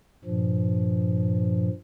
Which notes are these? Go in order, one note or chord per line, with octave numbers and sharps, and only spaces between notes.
G2 A#2 F3